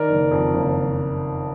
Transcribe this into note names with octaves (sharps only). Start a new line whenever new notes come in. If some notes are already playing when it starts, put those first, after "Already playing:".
Already playing: D#3 A#4 D5
F#1
F2
F#1